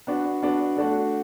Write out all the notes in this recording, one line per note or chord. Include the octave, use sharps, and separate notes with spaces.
B3 D4 F#4
B3 D4 F#4
A3 D4 F#4